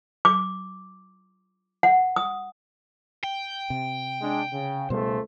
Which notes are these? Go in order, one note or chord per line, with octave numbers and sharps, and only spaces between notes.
D6
F#5
D#6
G5
C3
G#3 D4
C#3
C#2 B2 G3 A3 C5